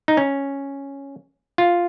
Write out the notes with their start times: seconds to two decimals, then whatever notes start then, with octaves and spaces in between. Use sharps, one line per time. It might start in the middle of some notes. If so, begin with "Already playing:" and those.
0.08 D#4
0.17 C#4
1.58 F4